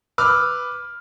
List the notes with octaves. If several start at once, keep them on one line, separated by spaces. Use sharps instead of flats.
B4 D6 E6 F6